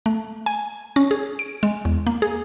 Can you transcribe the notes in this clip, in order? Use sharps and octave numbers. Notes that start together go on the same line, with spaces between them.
A3
G#5
C#4
G#4
D7
G#3
E2
A#3
G#4